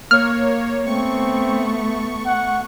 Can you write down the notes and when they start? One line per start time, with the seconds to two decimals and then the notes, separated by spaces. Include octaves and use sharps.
0.11 A#3 C#5 F6
0.86 A3 B3 C4 C#6
2.26 F#5